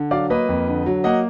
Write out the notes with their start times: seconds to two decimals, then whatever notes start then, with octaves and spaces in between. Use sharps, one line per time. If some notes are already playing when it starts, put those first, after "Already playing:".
Already playing: D3
0.11 F#3 D5 F5
0.30 A#3 B4 D#5
0.49 F2
0.68 D3
0.86 F#3
1.04 A#3 D#5 F#5